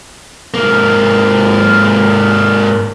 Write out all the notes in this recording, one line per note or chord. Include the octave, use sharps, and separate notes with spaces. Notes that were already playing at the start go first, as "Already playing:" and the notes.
G#2 A#3